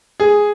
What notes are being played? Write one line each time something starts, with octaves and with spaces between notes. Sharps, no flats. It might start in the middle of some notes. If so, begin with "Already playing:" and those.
G#4